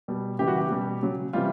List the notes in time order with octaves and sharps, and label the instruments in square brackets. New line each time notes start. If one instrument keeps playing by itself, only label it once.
[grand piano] B2 G3
C#3 E3 G3 G4
F#4
G4
B2 G3
C#3 F#3
C3 E3 G3 F4